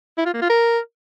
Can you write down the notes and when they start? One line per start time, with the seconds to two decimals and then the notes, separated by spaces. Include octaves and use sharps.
0.18 E4
0.26 F4
0.34 A#3
0.42 F4
0.50 A#4